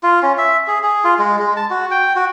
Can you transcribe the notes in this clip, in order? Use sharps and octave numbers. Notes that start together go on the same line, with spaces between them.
F4
C#4
E5
G#4
G#4
F4
G#3
G#3
A5
F#4
G5
F#4